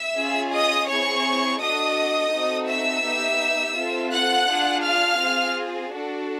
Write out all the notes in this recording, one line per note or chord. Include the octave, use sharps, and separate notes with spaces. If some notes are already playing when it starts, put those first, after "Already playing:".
Already playing: E5 E6
C#4 F4 G#4
D#5 D#6
C4 E4 G#4 C#5 C#6
D4 F#4 A4 D#5 D#6
C4 D#4 F#4 A4
E5 E6
B3 D#4 G4
C4 F4 A4
F#5 F#6
D4 F4 G#4
F5 F6
C4 F4 G#4
D4 F#4 A4